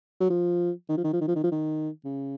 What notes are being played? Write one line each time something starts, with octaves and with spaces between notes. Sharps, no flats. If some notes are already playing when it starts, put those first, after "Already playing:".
F#3
F3
D#3
F3
D#3
F3
D#3
F3
D#3
F3
D#3
C#3